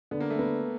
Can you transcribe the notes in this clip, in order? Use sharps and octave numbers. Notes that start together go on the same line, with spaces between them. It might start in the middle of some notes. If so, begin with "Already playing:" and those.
D3 B3
A#3
A3
A#3 B3